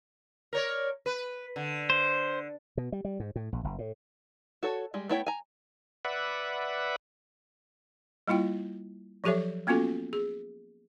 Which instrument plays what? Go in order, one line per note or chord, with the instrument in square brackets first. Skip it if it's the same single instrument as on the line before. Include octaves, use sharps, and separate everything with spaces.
[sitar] A#4 C#5 D5
B4
D3
[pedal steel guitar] C5
[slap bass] B2
G3
G3
G#2
A2
A#1
F#1
A2
[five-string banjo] F#4 A4 C#5
G3 G#3
A3 B3 E4 C#5 G5
G#5 A#5
[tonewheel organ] B4 D5 E5 F#5
[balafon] G3 A#3 E4 F4 G5
F3 F#3 G4 A4 C#5 E5
A#3 B3 C#4 F4 F#4 A4
G#4